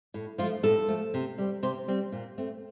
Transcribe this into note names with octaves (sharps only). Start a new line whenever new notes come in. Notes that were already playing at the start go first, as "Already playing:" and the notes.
A2
F3 A3 F4
A2 A4
F3 A3
C3
G3 C4
C3 C5
G3 C4
A#2
A3 C4